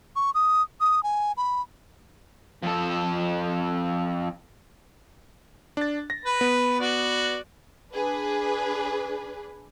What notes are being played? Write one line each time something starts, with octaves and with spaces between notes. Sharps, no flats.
C#6
D#6
D#6
G#5
B5
F2 A4
D4 A6
A#6
B4
B3
F#4 D5
D4 G#4 B4